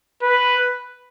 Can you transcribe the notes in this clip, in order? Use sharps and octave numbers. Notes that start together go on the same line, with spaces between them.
B4